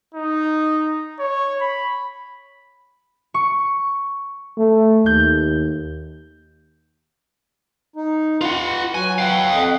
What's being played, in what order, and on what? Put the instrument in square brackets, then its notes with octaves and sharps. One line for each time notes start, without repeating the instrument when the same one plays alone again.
[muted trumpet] D#4
C#5
B5
[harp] C#6
[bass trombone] A3
[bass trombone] D#2 [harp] G6
[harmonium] D#4
[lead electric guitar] F4 F#5 [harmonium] B4
[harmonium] F#3 F#4 B4 [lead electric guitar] G#5
[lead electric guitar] F5 G5
[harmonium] F2 D#5 F#5